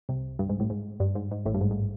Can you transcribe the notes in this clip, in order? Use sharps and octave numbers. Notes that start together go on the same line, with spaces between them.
C2 C3
G2
G#2
A1 A2
G#2
G2
G#2
G#2
A1 A2
G2
G#2
G#2